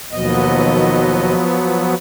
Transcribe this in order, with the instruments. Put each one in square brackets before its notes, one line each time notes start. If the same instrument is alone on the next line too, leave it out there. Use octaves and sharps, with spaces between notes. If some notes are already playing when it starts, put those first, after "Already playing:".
[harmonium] D#2 B2 D#5 [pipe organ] F3 F#3 B3